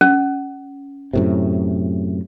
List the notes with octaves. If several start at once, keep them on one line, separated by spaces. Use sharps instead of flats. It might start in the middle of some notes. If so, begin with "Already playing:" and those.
C#4
F#2 A2 C3